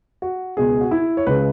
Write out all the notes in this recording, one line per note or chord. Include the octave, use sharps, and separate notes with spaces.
F#4
C#2 B2 G#3 B3 G#4
F#4
E4
C#5
C#2 C#3 G#3 B4